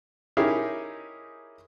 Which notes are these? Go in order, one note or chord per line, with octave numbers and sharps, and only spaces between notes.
C#4 D#4 E4 G4 G#4 A#4